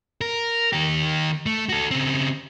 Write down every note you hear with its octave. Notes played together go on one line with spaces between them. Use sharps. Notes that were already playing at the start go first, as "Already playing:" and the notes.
A#4
D#3 G4
A3
F#4 A4
C#3 C4